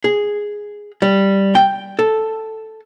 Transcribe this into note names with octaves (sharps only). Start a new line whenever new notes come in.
G#4
G3
G5
A4